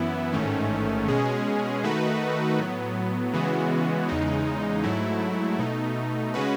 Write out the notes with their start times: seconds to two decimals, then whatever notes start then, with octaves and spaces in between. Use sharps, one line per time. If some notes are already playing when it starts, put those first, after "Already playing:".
Already playing: F#2 E3 B3 E4
0.33 A1 G#2 D#3 A3 C#4
1.08 B2 G#3 C#4 G#4
1.83 D#3 A3 D#4 F#4 B4
2.58 A2 F#3 B3
3.34 C#3 E3 G#3 B3 F#4
4.09 E2 C#3 G#3 D#4
4.84 G#2 F#3 A3 E4
5.59 B2 A3 D#4
6.34 C#3 G#3 C#4 F#4 B4